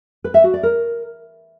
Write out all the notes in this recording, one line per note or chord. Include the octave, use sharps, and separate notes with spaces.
B4
E5
F#4
D5
A#4